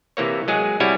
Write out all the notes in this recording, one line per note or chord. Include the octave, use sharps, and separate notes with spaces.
C3 E3 A#3 C#5
F#3 G#3 G#4
C3 G3 E4 F#4 C#5 G#5